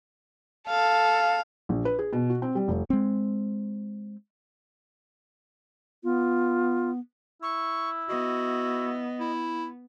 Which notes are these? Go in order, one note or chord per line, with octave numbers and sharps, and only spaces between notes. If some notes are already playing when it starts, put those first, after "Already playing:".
A4 F5
A#1
B4
G#4
B2
F#4
C4
G3
F1
G#3 C4
B3 F4
E4 C#6
B3 F#4 D#5
E4